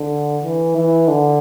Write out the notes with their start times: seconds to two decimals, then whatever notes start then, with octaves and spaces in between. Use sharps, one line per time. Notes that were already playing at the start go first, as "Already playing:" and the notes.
Already playing: D3
0.44 E3
0.77 E3
1.08 D3